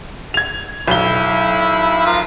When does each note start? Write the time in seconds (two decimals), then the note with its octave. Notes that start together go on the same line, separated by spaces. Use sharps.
0.34 G#6 F7
0.88 B1 E4 G7
2.06 F3 F4 A#4